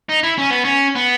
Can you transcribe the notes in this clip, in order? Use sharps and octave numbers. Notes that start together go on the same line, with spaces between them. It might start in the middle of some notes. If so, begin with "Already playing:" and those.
D#4
E4
C#4
B3
C#4
B3